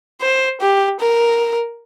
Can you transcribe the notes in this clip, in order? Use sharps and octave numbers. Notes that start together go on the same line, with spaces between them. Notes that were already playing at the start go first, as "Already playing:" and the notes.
C5
G4
A#4